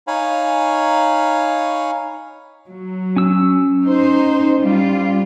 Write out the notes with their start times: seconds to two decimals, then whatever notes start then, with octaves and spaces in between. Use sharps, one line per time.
0.07 D#4 C#5 F5 G#5 B5
2.69 F#3
3.16 C#4 E6
3.84 D#4 C5
4.61 G3 F4